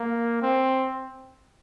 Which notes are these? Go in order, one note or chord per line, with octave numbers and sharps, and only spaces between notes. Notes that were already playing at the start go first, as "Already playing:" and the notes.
Already playing: A#3
C4